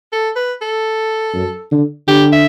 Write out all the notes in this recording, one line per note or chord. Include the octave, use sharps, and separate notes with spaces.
A4
B4
A4
F#2
D3
D3 G4
E5